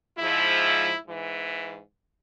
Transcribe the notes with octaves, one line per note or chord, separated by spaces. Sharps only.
G#2 F3 E4
G#2 E3